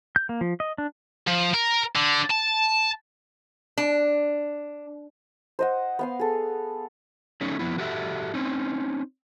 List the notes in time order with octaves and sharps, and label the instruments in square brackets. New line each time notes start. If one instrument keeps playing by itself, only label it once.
[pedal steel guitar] G6
A#3
F3
D#5
D4
[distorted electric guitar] F3
A#4
D3
A5
[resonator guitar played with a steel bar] D4
[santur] C5 D#5 F#5
B3 F5 C6
G#4 A4
[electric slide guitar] F#3 A3 C#4 D#4
F3 B3 E4
F#4 G4 A4 E5
C4 C#4 D#4